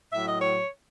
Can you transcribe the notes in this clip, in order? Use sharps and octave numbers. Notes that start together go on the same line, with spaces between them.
A2 F#3 E5
D#5
C#5